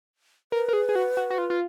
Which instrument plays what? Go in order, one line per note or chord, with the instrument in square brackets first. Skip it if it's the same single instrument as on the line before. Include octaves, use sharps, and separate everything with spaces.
[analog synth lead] A#4 [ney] B4
[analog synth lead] A#4
G#4
G#4
F#4
F#4
F#4
F4
F4